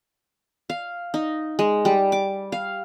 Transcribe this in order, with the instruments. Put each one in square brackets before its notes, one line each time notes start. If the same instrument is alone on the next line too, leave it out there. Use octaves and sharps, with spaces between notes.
[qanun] F5
D#4
G#3
G3
D6
F5